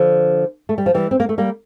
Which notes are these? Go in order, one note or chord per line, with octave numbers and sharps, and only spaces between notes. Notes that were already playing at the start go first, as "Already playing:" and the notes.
Already playing: D3 F3
A3
G3
F3
E3 G3
C4
A#3
A3
G3 A#3